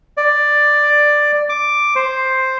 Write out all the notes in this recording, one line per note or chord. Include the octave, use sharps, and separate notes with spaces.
D5
D6
C5